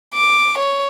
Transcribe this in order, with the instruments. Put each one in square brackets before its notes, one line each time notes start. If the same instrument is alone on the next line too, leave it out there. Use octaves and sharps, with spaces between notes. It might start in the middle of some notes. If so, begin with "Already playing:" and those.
[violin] D6
C#5